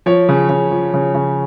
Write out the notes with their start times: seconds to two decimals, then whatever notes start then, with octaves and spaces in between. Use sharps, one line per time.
0.06 F3 C#5
0.29 C#3
0.49 C#3
0.72 F3
0.94 C#3
1.15 C#3